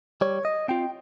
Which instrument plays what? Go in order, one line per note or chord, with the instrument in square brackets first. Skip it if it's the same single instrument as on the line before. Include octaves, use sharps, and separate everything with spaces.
[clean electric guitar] G3 C#5
D#5
C4 F4 G5